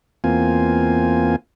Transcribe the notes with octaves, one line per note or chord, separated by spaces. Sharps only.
E2 A#3 C4 F4 G#5